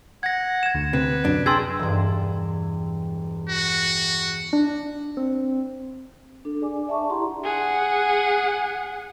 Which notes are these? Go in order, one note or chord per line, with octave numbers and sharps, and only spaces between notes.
F#5 G#6 A#6
G#6 E7
D2
C3 B4
F#2 D4
G#4 G5 A5 C6 E6 G#6 A#6
E1 G2
F#4
D4
C4
D4 A4
D4 G#4 D5 G#5 D6
D5 E5 A5 C#6
E4 G4 F#5 A#5 C6
G#4 F#5